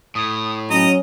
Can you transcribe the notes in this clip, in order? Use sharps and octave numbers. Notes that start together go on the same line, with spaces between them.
A2 D#6
F#3 C#4 D#5 A#5 D#7